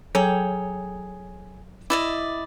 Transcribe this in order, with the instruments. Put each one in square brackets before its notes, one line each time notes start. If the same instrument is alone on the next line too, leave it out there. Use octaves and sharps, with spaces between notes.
[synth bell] F#3 A4 C#5 [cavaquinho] G#4 G5
[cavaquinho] E4 D5 D#5 [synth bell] D6